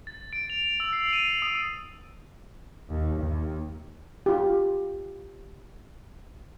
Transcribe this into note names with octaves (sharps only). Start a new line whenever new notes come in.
A6
D7
F7
E6
C7
D#7
D#6
D#2
D#2
F4 G4